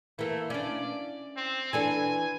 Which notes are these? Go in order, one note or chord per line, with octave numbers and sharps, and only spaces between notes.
E3 A3 A#3
C#4 D4 D5
C4
E3 D4 A4 G#5